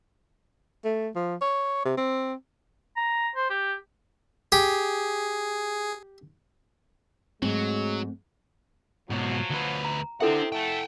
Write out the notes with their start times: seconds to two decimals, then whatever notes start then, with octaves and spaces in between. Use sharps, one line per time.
0.85 A3
1.16 F3
1.41 C#5
1.85 C3
1.97 C4
2.96 A#5
3.36 C5
3.50 G4
4.52 G4 G#4
7.42 G#2 F#3 G#3 A3 C4
9.10 G#2 B2 F3 F#3
9.50 D2 B4
9.85 A#5
10.20 C3 C4 D4 E4 A4 E5 F#5
10.52 A3 F#5 G5